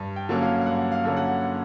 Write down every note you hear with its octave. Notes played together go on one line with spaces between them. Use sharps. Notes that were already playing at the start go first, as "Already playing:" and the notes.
Already playing: G2
G5
D3 F#3 A#3 C#4
F5
F5
G2 F#5
F5
D3 F#3 A#3 C#4
F#5